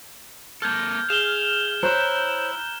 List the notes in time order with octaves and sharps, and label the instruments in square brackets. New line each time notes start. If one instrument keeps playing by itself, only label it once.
[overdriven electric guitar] A#3 A4 [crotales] F6 G6 G#6
[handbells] G#4 [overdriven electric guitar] F5 [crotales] E7 G7
[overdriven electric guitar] E4 [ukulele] C5 C#5 [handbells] A#5 F#6 G6